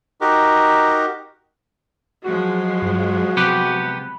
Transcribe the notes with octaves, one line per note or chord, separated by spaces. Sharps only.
D#4 F#4 G4 A#4
F3 F#3 G#3 F#4
G2
C3 B3 G4 B5 F#6